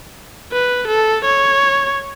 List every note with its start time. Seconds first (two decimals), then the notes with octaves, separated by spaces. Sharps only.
0.52 B4
0.87 A4
1.25 C#5